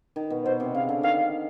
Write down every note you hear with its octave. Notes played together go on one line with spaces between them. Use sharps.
D#3
B2
B2 C5
C3
C#3 F5
D3
D#3 F5